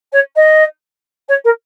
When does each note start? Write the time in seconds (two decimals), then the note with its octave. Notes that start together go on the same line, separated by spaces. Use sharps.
0.12 C#5
0.36 D#5
1.28 C#5
1.44 A#4